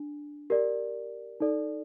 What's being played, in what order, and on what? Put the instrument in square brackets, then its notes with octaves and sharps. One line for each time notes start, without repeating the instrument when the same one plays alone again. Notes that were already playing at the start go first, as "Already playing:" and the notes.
Already playing: [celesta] D4
G4 A#4 D5
D#4 A4 D5